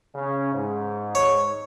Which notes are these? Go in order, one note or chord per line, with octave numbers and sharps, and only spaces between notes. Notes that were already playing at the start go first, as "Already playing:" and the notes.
C#3 C#4
G#2
C#5